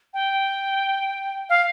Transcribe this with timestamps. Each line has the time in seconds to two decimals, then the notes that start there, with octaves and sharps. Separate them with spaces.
0.14 G5
1.49 F5